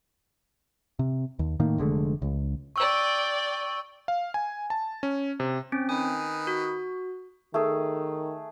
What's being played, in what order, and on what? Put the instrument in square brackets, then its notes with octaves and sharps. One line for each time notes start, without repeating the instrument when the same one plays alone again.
[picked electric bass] C3
D#2
A2 D#3 A#3
F1 D3 G#3 A3
C#2
[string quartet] D5 G5 [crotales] C#6 E6
[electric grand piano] F5
G#5
A5
C#4
C3
[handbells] C4 C#4
[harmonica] D#3 B4 D#6 [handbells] G#5
[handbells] F#4
[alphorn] D#3 [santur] A3 G#4